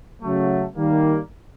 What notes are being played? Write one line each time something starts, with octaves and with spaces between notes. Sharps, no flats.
C#3 F#3 A3
D#3 G3 A#3